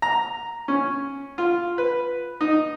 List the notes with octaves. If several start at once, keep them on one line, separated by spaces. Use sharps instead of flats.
A#5
C#4
F4
B4
D#4